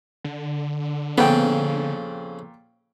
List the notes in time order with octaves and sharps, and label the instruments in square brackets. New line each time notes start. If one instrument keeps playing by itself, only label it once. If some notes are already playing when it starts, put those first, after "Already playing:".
[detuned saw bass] D3
[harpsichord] F2 C#3 [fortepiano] A#2 G5 [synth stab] B3